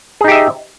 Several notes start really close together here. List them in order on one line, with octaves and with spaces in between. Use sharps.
G#4 D#4 G4 E5 D#5